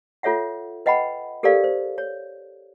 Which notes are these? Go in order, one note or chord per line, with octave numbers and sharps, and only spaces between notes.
F4 A4 C#5 E5 F#5
B4 D#5 F#5 G5 B5
G4 A4 A#4 C5 D5 F5
C5
C#5